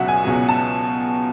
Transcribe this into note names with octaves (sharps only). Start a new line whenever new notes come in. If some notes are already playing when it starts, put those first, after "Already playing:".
Already playing: C#2 B2 F#3 E5 F#5
G#5
C#2 B2 F#3 G#5
A5